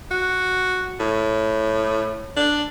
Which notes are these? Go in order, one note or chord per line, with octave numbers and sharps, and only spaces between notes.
F#4
A2
D4